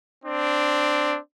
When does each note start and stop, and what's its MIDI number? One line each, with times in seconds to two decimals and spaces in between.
0.24 1.18 60
0.24 1.18 62